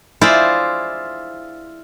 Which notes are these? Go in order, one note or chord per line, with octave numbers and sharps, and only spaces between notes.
E4 F4 G#4 C5 D5